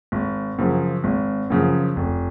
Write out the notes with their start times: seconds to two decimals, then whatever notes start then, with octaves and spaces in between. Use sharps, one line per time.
0.12 G#1
0.58 F#2 C#3 F3
1.04 G#1
1.50 F#2 C#3 F3
1.96 F1